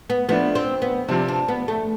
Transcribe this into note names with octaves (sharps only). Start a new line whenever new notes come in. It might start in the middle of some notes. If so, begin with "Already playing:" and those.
B3
F3 A3 B3 D4
C4
B3
C3 F3 C4 D4
D4
B3
A3